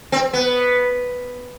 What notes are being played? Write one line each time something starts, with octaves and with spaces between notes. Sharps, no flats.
C4
B3